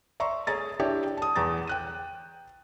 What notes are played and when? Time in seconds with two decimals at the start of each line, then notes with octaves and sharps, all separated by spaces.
0.20 D5 E5 A#5 C6 C#6
0.47 G#4 C#5 A#5 A6
0.79 D4 E4 G4 C#5 D5
1.17 A5 D#6
1.36 E2 A#5 A6
1.67 G5 F#6 D#7